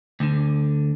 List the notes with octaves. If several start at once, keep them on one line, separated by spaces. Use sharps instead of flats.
D2 D3